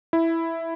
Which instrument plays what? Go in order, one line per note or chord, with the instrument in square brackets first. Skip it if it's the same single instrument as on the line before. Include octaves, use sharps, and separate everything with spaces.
[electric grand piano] E4